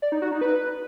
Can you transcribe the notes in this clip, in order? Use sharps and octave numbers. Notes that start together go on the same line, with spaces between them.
D5
D#4
F#4
D#4
B4